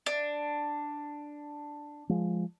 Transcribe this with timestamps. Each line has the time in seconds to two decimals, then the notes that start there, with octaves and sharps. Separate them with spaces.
0.06 D4
2.09 F3 G#3